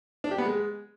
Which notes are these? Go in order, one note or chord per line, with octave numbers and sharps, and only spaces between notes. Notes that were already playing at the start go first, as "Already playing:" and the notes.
D4
G4
B3
G#3